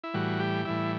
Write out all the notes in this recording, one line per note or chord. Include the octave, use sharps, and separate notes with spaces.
E4
A2 E3 G3 F#4
G4
A2 E3 G3 E4